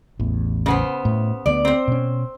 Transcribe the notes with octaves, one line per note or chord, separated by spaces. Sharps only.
A1 E2
C#3 B3 C5
A2
D2 G3 B3 D5
C4 C5
B2 C#4